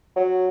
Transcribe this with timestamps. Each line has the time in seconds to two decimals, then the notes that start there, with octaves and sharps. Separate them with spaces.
0.16 F#3